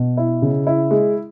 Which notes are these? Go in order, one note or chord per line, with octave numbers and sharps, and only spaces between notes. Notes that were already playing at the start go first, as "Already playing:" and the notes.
Already playing: B2
E4
C#3
E4
G#3